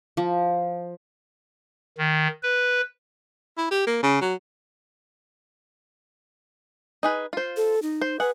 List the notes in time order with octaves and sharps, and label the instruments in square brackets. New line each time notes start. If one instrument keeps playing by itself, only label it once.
[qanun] F3
[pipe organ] D#3
B4
[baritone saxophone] E4
G4
A#3
C#3
F#3
[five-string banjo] D#4 G#4 B4
F4 C5
[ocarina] A4
D#4
[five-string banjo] C5
[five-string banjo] G#4 F#5 [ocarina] B4